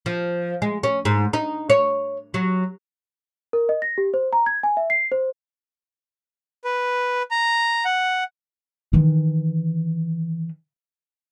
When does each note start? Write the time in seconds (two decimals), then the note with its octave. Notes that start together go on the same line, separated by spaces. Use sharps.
0.06 F3
0.62 G#3
0.83 C#4
1.05 G#2
1.33 D#4
1.70 C#5
2.34 F#3
3.53 A#4
3.69 D#5
3.82 A#6
3.98 G4
4.14 C5
4.33 A#5
4.46 G#6
4.63 G#5
4.77 E5
4.90 C7
5.12 C5
6.65 B4
7.31 A#5
7.85 F#5
8.93 D#3 E3